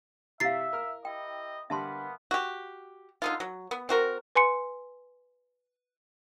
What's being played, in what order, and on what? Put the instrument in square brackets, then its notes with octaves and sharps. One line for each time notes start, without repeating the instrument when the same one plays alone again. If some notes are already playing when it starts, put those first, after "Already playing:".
[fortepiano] C3 [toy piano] E4 F5 [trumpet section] E5 [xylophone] A6 C7
[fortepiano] A#4 F6
[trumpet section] E4 G4 D#5 [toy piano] G5
[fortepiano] D3 G3 B5 [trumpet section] A#3 B3 [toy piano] E5 A5 C6
[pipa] F#4 G4
D3 D#4 F4
F#3
B3
C4 F#4 A#4
[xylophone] B4 G#5 C6 C#7